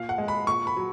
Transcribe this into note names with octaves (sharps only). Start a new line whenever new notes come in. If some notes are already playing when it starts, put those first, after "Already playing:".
Already playing: A#2 F5
F#5
G#3
B5
A#2 C#6
B5
F#3